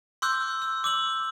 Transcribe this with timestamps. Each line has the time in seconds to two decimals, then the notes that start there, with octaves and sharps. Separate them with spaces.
0.22 C6 D6 E6 F#6 G6
0.62 E6
0.84 D6 E6 F#7